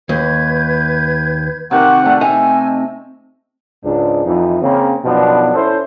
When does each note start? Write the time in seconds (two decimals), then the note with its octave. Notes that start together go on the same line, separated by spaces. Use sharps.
0.09 D#2 B4 G6 G#6
1.71 C3 D#3 C4 F#5 C#6 D6
2.03 A3 C4 D5 C#6
2.21 D#4 D#5 E5 G#5
3.84 C#2 G#2 D4
4.26 F2 E3 D#4
4.61 C#3 A#3 C4
5.05 F#2 B2 F3 B3 D4 D#4
5.55 C#4 E4 A4 C5